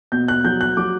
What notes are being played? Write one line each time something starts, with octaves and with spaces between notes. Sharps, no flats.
B2 G6
F#6
F#3 G6
F#6
F#3 D6